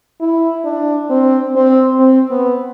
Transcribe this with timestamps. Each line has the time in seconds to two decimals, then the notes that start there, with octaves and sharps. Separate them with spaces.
0.21 E4
0.64 D4
1.10 C4
1.56 C4
1.99 C4
2.31 B3